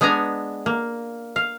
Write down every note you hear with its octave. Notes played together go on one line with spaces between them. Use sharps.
G#3 B3 D4 G#5 A#5
A#3
F5